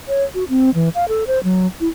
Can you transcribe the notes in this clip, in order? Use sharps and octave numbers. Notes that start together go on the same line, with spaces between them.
C#5
F#4
C4
E3
F5
A4
C5
F#3
E4